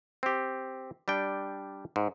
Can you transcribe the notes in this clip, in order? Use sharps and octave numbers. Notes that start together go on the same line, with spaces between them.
C4 G4
G3 D4 G5
G#2